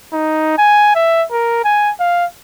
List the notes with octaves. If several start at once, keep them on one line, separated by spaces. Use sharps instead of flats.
D#4
G#5
E5
A#4
G#5
F5